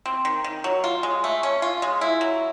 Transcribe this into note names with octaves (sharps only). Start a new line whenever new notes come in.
C4
D#3
D#3
F#3
F4
G#3
A3
C#4
F4
G#3
E4
F#3